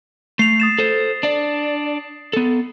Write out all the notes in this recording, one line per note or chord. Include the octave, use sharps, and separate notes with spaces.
A3 C7 F7
D#6 A6 E7
A4 C5
D4 D5
B3 A4